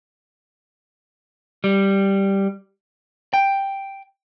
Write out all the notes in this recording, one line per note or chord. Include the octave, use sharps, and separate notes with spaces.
G3
G5